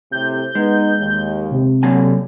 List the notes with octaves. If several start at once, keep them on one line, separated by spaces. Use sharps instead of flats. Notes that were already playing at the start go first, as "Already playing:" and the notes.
A2 C3 G6
G#3 B3 D#4
D#2
C3
D3 F#3 A#3 G#5